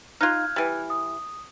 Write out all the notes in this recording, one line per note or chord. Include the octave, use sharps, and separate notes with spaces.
D#4 F4 F6 F#6 G#6
E3 G3
D#6